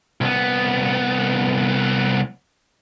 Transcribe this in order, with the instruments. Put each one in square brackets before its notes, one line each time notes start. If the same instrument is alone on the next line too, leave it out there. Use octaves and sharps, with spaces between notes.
[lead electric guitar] C2 B3